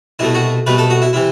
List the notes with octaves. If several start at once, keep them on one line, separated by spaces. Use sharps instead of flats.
C2 B2 A3 E4
F#4
C2 B2 A3 B4
A4
F#4
E4
C3 E3 E4